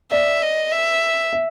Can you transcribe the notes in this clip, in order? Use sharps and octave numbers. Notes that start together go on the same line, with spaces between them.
D5 E5
D#5
E5
E5